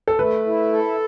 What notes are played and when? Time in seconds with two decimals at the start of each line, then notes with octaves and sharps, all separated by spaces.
0.08 A4
0.18 A3 B4
0.46 E4
0.73 A4